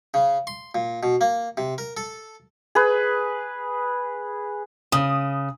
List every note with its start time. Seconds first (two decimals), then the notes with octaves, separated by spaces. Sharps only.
0.14 C#3
0.47 C6
0.75 A#2
1.03 B2
1.21 A#3
1.57 C3
1.78 A#4
1.97 A4
2.75 G#4 B4
4.92 C#3 D#6